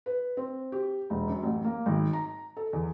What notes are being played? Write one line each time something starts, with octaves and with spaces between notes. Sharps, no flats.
B4
C4
G4
E1
F#2
A1
A#3
G#1
A#5
A4
E2